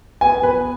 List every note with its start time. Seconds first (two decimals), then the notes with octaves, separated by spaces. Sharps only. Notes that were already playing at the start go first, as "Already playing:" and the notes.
0.21 B3 G#5
0.38 B3
0.43 B4